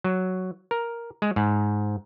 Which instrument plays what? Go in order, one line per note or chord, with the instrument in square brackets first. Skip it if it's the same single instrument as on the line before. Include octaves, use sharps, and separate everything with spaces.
[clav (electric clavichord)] F#3
A#4
G#3
G#2